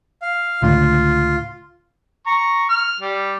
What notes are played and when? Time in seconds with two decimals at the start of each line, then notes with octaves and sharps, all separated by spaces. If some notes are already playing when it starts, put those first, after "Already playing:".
0.22 F5
0.62 C#2 A2 D3 F4
2.27 A#5 C#6
2.69 F6
3.00 G3